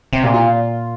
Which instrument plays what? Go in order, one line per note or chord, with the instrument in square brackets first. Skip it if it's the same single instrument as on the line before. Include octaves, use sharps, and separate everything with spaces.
[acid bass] C3
[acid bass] A#2 [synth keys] G4
[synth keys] F4